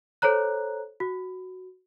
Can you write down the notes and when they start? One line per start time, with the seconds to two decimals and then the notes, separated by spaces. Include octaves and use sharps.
0.22 A4 C5 C#5 A#5 F#6
1.00 F#4